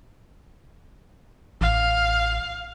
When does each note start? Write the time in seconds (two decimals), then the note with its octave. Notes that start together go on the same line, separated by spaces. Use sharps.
1.61 A1 F5